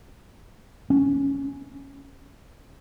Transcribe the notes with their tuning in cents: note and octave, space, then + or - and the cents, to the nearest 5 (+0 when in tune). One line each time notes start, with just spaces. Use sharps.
C#4 +0